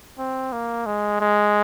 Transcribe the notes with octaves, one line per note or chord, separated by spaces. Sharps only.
C4
A#3
G#3
G#3